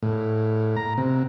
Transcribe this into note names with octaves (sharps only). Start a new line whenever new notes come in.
A2
A#5
C3